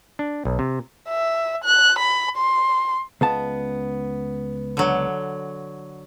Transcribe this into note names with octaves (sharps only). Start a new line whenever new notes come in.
D4
B1
C3
E5
F#6
B5
C6
C#2 B3 A5
D3 F#3